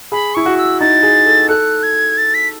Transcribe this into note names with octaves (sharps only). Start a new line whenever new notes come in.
G#4 B5
E4 C#6
F#4
E6
D#4 A6
G#4
A4
A4 F#6
G#6
A6
B6